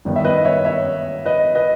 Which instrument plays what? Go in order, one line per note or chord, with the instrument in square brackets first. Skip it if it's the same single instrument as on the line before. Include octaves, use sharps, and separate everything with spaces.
[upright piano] G1 G2 D#3 G3 B3
E5
B4 D#5
C#5 E5
C#5 E5
B4 D#5
B4 D#5